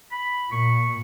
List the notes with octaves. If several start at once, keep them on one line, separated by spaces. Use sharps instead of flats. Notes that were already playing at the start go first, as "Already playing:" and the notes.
B5
A#2 C#6